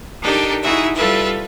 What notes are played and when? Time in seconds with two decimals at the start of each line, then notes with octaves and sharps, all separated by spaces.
0.21 D4 D#4 G4 A4 A#4
0.63 D#4 E4 F#4 G#4 E5
0.95 G3 F4 A4 B4 E5